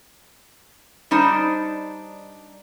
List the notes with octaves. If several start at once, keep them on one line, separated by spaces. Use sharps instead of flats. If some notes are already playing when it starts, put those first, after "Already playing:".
G3 D4 D#4 C5 D#5